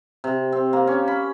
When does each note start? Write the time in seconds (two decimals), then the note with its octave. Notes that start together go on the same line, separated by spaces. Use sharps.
0.24 C3
0.52 C4
0.73 A#3
0.87 C#4
1.08 B5